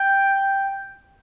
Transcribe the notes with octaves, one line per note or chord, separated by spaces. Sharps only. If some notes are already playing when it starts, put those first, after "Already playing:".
Already playing: G5